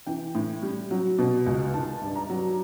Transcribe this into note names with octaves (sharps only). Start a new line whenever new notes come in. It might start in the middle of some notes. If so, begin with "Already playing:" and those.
E3 G5
A2
G3
F#3
B2
C#2
D#3 A5
G2
A#5
F#3